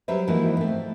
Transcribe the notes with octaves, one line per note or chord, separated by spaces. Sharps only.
F#3 G3 C#4 B4 C5 E5
G#2 E3 F3 A#3 E4 F#4
A3 C4